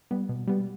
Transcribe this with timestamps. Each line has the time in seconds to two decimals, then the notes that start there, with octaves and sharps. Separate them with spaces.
0.11 G3 B3
0.29 B2
0.47 G3 B3